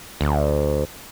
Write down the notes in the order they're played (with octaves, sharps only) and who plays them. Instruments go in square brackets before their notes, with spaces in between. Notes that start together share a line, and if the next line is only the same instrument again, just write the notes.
[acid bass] D2